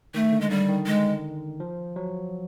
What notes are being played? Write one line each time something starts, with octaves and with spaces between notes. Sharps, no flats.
D#3 A3
D3
G#3
D3 G3
D#3
G#3
F3
F#3